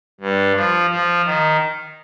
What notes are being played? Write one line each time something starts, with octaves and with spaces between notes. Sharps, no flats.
G2
F3
F3
D#3